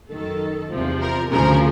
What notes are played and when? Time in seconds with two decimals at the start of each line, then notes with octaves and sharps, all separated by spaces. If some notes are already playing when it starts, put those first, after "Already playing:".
0.10 F#2 D#3 A4
0.71 E2 C3 F3
1.01 A#4
1.31 D2 C#3 F3 A#4